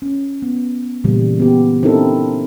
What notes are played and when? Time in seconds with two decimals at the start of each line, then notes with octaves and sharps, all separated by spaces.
0.02 C#4
0.42 B3
1.04 A#2 C#3 E3 G3 A#3
1.40 B3 G4
1.83 C4 C#4 D#4 E4 A4 A#4